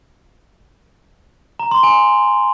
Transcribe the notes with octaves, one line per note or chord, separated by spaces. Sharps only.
A#5
C6
G#5